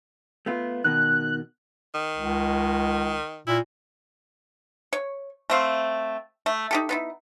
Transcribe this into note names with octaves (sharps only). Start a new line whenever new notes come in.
A3 B3 F4
B2 D#3 F#6
D#3
C#2
A#2 E4
C#5
A3 C4 F5
A3
D#4 G4 A4
B3 D#4 E4